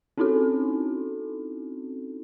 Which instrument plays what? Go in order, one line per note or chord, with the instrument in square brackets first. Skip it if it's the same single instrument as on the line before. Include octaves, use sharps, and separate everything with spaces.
[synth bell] C4 C#4 D#4 E4 F#4 A4